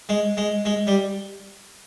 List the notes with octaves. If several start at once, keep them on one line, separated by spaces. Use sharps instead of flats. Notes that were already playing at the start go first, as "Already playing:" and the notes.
G#3
G#3
G#3
G3